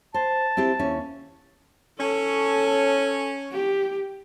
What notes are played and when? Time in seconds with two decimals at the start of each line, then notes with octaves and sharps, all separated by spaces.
0.14 C5 A5
0.57 C4 E4 G4
0.79 D#2 C#4 E4
1.99 C#4 A4
3.52 G4